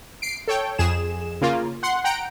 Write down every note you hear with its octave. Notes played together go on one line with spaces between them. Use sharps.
C7 D7
A4 C#5 G5
F2 G#4 E7
C#3 A#3 F4
F#5 C6
F#5 G5 A#5 D7